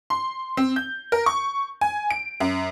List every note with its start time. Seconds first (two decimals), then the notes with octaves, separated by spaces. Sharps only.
0.10 C6
0.57 C4
0.76 G6
1.12 A#4
1.26 C#6
1.81 G#5
2.11 D7
2.40 F#2